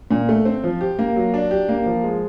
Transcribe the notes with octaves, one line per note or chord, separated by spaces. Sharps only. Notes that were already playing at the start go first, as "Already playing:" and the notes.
A#2
A3
C4
F3
G4
A#3
F#3
D4
G4
A#3
F3
G#3